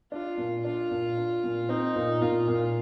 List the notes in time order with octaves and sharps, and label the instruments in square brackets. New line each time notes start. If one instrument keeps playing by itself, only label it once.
[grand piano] D4 [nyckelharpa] F4
[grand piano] A#2
[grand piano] D4 [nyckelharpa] F4
[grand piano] A#2
D4
A#2
[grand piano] C4 [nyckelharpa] D#4
[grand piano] A#2
[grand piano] A#2 [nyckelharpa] F4
[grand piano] A#2